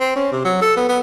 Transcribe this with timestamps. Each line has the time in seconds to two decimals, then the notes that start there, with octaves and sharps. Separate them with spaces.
0.01 C4
0.16 C#4
0.32 C3
0.45 F#3
0.62 A4
0.77 B3
0.89 B3